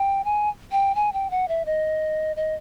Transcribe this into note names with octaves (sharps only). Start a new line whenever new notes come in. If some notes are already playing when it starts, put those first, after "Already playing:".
Already playing: G5
G#5
G5
G#5
G5
F#5
E5
D#5
D#5